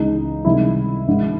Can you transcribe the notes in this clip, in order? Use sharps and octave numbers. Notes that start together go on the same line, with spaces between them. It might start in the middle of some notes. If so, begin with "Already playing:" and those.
Already playing: C#2 C#3 E3 D#4
C2 C3 D#3 G#3 E4
G#1 G#2 D#3